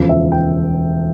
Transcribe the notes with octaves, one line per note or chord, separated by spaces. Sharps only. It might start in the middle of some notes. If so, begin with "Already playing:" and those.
Already playing: E1 D2 C#3 F3
E5
G5